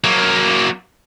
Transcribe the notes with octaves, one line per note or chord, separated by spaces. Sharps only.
F#3 A#3